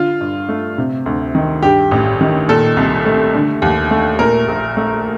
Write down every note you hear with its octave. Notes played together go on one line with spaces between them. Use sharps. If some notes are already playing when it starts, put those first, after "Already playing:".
Already playing: D3 F4
G2
A3
C3
D2
D#3
G2 G4
A1
D#3
A#2 A4
C2
A3
D3
D#2
A3
A#2 A#4
A#1
A3